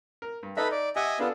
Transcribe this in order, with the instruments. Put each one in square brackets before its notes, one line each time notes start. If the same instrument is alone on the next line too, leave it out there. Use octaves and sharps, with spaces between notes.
[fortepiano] A#4
G2
[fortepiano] D#4 D#5 E5 [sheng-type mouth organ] A4 B4 B5
[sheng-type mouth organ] D5
[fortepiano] G4 F#5 [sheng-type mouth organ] D#5 E5 G#5
[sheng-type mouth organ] B3 F4 [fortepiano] D4 G#4 A4